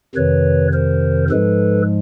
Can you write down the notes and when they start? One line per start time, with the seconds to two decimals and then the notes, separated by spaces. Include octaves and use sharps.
0.15 F2 C3 D#3 B4 C#5
0.73 A#4 C5
1.30 G#2 F3 G#3 A4 B4